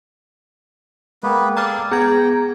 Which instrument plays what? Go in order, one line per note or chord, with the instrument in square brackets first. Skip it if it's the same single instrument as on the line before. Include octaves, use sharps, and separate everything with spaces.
[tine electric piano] G#3 G5 [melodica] A#3 B3 B4
[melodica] A4 D5 F5 [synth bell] A#5 D6 F6
[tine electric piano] B3 [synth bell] G#4 G#6 [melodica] G5 [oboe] A#5